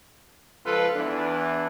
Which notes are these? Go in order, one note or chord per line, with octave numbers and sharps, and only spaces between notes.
C#2 F3 F4 A4 B4
E2 E3 D4